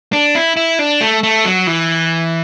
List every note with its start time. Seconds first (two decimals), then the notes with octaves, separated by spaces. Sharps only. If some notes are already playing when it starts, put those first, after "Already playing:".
0.13 D4
0.35 E4
0.57 E4
0.79 D4
1.01 A3
1.23 A3
1.45 F#3
1.67 E3